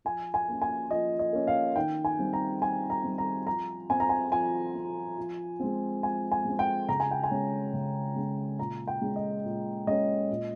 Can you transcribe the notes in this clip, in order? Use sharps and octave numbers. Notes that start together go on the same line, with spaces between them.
F3 G#5
G#5
A#3 C#4
G#5
F3 D#5
D#5
A#3 C#4
F5
D#3 G5
G#5
G3 C4
A#5
D#3 G#5
A#5
G3 C4
A#5
F3 A#5
C4 G#5
A#5
G#5
F3 G#5
C4
F3
G#3 C4
F3 G#5
G#5
G#3 C4
G5
C#3 A#5
G#5
G5
G#5
G#3 C#4
C#3
G#3 C#4
A#2 A#5
G5
G#3 C#4
D#5
A#2
G#3 C#4 D#5
A#2